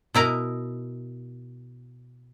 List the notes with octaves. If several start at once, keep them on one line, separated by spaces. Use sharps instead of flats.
B2 E4 A#4 D#5